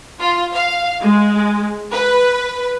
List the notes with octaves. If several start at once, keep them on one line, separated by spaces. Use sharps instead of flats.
F4
F5
G#3
B4